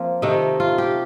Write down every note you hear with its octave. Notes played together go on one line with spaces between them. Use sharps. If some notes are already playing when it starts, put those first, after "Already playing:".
Already playing: F3 A#3 C4 F4
C3 D#3 A3 D#4
F4
G4